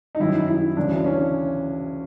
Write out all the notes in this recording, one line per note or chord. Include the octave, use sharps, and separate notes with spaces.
D#4
F#2 D#3 E4
E4
D2 C#3 E3 D4
C#4